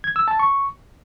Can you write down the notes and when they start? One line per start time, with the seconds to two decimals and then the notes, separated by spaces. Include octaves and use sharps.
0.04 G#6
0.16 E6
0.28 A5
0.39 C#6